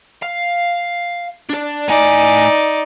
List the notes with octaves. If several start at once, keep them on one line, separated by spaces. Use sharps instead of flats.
F5
D4 D5
A2 D#4 D5 G#5